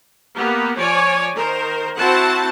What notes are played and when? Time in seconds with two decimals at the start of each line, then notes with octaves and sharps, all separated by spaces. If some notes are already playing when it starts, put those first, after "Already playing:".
0.36 A#3 B3 G4
0.78 F3 C#5 D5 G#5
1.35 D#3 A#4 C5
1.97 C4 E4 F#4 C5 F#5 A5